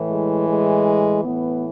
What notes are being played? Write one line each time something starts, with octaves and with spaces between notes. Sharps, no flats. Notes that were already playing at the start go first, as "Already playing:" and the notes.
Already playing: A2 E3
G#3
G#3
A2 E3 B3